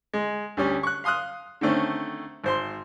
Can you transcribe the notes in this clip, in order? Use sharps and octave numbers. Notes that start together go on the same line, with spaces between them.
G#3
D2 G3 C#4
C#6 F#6
F5 C6 D#6 F6 F#6
D3 D#3 A3 C4 C#4
G#1 C5 C6